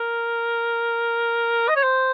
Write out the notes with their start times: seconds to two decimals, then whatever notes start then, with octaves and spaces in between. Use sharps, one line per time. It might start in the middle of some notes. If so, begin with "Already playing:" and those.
Already playing: A#4
1.68 D#5
1.76 C#5
1.83 C5